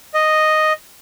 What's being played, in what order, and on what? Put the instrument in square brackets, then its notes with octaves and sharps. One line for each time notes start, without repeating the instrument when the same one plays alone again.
[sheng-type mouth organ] D#5